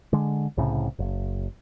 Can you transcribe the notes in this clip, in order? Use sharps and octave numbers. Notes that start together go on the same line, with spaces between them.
D3 G#3
C2 A2 C#3
F#1